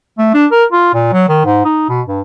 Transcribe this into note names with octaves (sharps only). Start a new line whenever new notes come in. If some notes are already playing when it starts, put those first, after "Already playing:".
A3
D4
A#4
F4
A#2
F#3
D#3
G#2
D#4
B2
G2